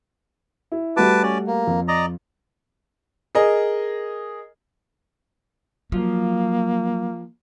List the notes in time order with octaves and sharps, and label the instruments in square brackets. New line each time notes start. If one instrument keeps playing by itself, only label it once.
[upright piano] E4
[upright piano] G3 A3 F#4 [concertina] B4 A5 D6
[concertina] C#4 D5
A#3
[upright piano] F2
[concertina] D5 D#5 A#5
[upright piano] G#4 A#4 D#5
[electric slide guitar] F3 F4 [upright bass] F#3 [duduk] A#3